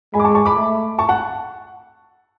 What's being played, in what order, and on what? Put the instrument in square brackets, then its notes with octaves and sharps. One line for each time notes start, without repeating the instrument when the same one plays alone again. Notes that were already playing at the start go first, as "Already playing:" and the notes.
[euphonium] G#3 [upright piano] G#5 B5
[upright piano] D6
A5 C#6
A5 C#6
B5 D6
[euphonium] A3
[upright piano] A5 C#6
F#5 A5